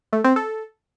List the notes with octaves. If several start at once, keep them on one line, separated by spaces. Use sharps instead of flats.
A3
C4
A4